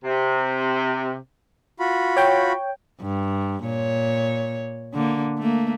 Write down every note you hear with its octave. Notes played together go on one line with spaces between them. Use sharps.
C3
F4 F#4 B5
C#5 G5
G2
A#2 C#5
D3 A#3
A3 A#3